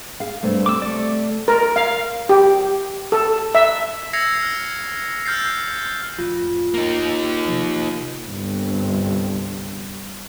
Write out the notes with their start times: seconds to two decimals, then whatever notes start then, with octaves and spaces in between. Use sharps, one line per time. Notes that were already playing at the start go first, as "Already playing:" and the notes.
0.20 G#4 F5
0.43 G2 C3 A3
0.66 C3 D6 E6
0.82 A3 D5
1.48 A#4
1.76 F5
2.29 G4
3.12 A4
3.55 E5
4.13 E6 G#6 A#6 C7 C#7 F7
4.42 F6
5.25 E6 F6 G6 A6 C7
6.18 F2 A2 F4
6.74 A#3 D#4
7.45 C3 F3
8.26 G1 C2